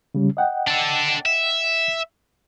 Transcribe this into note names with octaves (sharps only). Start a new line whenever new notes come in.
C#3 G3 C#4
D#5 F#5 G5
D4 A4
E5